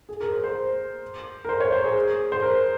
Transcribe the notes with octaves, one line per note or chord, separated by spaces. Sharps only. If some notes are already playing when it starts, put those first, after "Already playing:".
G#4
A#4
C5
C5
A#4
C5
C#5
C5
G#4
C5
A#4